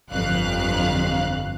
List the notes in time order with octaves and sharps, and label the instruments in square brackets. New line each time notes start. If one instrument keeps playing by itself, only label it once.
[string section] G1 F2 F5 F#6